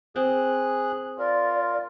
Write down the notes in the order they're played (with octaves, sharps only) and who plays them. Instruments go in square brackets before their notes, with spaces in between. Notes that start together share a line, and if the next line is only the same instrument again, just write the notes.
[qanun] C4 [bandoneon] G#4 F#6
[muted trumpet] F4 [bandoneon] A#4 [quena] D5